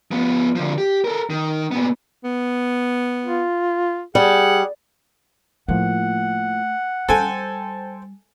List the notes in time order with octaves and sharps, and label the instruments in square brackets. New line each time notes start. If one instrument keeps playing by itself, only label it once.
[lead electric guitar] F3 B3
D3 F3
G4
A4 A#4
D#3
A#2 B3
[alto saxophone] B3
[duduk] F4
[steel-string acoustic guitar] G3 [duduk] G#4 [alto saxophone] F#5
[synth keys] A2 F3 A#3 [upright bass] A3 [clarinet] F#5
[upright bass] G3 [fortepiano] A4 G#5 [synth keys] C5 G5